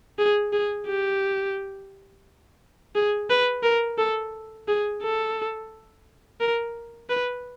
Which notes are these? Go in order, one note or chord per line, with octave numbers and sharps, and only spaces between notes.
G#4
G#4
G4
G#4
B4
A#4
A4
G#4
A4
A#4
B4